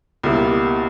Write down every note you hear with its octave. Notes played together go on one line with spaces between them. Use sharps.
C#2 B2 G3 A#3 E4